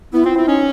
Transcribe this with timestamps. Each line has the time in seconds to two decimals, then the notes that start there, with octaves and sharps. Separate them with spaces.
0.13 B3 E4
0.24 C4 F4
0.35 C4 E4
0.47 C#4 D#4